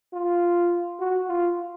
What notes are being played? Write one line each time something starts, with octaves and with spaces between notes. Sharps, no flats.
F4
F#4
F4